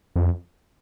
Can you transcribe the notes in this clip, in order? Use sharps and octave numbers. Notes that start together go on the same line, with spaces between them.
F2